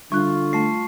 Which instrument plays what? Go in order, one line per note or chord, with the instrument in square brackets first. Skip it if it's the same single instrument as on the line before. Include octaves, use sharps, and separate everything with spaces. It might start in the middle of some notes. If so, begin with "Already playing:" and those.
[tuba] D3 [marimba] G3 D4 F#6 [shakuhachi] F4 [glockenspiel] C#6
[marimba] A3 [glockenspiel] A5 C7